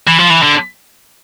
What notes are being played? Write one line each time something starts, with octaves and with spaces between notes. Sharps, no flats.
E3
F3
E3
D3